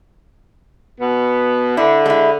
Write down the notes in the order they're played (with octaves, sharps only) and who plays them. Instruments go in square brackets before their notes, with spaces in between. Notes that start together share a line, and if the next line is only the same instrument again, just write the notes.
[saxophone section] B2 B3
[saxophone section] D3 [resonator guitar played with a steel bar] E4
[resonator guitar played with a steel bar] G#3 E4